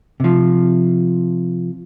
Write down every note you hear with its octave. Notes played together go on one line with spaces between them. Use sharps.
C3 F3